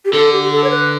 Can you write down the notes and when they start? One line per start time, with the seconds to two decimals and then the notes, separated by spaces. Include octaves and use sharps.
0.05 G4
0.13 D3 A4
0.33 G4
0.44 G4
0.52 A4
0.64 C#5
0.70 B4